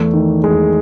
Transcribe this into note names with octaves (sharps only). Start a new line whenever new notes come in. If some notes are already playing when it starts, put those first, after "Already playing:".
Already playing: E2 A3
D#3
E2 G#3